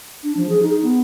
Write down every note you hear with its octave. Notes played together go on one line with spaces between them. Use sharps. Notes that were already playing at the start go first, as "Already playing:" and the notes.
D4
F3
G#4
D#4
B3